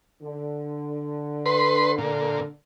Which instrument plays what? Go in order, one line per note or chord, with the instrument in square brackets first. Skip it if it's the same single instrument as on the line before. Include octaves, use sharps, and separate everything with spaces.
[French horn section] D3
[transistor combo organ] B4 C6
[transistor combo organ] A#2 [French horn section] D3